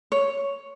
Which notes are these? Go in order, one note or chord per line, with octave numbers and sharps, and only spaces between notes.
C#5